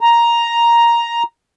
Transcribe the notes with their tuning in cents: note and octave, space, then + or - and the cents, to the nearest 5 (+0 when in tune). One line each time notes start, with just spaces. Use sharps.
A#5 +5